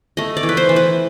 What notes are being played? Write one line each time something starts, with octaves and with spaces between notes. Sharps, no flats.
A3 D#5
D5
E3
B4
C5
E3
B4